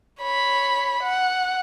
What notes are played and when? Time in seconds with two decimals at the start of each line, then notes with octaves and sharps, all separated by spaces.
0.21 C#5 B5
1.03 F#5